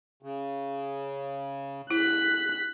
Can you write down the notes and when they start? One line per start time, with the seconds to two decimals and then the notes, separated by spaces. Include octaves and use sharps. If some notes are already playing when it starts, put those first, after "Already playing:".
0.23 C#3
1.91 E4 F#6 B6